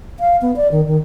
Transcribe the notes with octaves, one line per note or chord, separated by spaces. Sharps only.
F5
B3
D5
D#3
D#3